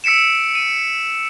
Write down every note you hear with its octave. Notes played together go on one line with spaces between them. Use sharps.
E6 B6 C#7 D7 E7
D#7